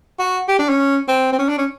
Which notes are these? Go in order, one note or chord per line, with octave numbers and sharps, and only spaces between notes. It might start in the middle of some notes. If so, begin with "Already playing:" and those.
F#4
G4
D4
C#4
C4
C4
C#4
D4
C#4